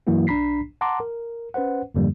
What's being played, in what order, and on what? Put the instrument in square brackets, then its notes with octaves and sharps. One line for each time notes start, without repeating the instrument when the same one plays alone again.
[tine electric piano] G2 E3 F#3 A#3 E4 F#4
B1 D4 A#5 B5 B6 C7
F#5 A5 A#5 C6 D6
A#4
C#4 B4 C5 F#5
F2 G#2 D3 F3 G3 A#3